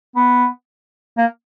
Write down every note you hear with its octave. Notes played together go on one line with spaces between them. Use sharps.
B3
A#3